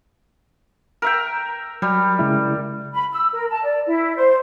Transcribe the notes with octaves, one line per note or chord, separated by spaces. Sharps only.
A#4 E5 G5
F#3 G3
C#3 G#3 E4
B5
E6
A#4
A5
D5
E4
C5